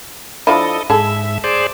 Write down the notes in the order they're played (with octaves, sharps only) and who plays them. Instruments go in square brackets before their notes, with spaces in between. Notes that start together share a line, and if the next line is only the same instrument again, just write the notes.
[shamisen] F3 D4 E4 [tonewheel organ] A4 D#5
[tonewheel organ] G#2 E5 [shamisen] G#4 A4
[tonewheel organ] G#4 C5 D5